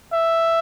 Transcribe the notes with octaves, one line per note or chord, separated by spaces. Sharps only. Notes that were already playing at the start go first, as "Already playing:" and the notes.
E5